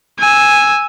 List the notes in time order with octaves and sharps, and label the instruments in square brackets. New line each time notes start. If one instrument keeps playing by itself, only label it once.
[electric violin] G#5 E6